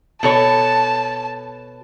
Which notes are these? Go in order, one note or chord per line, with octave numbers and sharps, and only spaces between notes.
B2 A4 C#5 A5